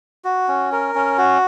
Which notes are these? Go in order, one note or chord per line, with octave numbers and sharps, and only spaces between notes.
F#4
C#4
A#4
C#4
F#4